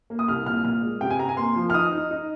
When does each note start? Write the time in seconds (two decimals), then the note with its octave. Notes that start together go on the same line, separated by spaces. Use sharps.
0.10 A#3
0.19 D#6
0.28 C2 F6
0.46 A#2 F6
0.65 A#2 F6
0.83 G#3
1.01 C3 G5
1.10 G#5
1.19 C3 A#5
1.29 G#5
1.37 A#3 C6
1.56 F3
1.70 F6
1.74 D#4 D#6
1.92 D#4
2.11 D#4